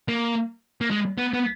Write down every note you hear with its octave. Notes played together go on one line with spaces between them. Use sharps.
A#3
A#3
G#3
B3
B3